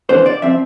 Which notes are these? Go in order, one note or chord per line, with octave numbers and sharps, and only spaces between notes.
F2 E3 B3 D4 C5
D5
F3 C4 E5